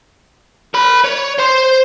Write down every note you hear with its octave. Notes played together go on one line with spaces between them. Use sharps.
A#4 B5
C#5
C5 C6